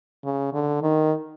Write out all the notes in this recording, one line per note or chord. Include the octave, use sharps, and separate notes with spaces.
C#3
D3
D#3